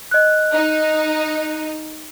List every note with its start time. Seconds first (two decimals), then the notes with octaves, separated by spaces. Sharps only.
0.11 D#5 F#6
0.53 D#4